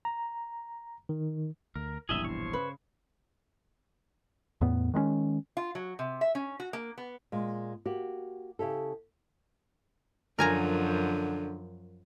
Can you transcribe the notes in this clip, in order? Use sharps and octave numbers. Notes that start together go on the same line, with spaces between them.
A#5
D#3
D2 A#4
E1 A#1 E2 G2 E3 G#4 D#5 E5
C5 C#5
C#3 B4
E2 A2 B3
D#3 G#3 B3 C#4
F4
F#3
C3
E5
C#4
F#4
A#3
B3
A#2 G#3
A#3 F#4 G4
C#3 E4 G4 A4
F#2 D3 F3 A#4 G#5 A#5